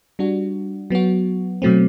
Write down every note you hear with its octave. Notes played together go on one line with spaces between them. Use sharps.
G3 D4 F#4
F#3 B3 F#4
B2 F#3 A3 C4